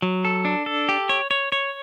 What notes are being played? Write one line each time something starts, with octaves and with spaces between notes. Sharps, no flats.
F#3
A4
D4
A4
G4
C#5
C#5
C#5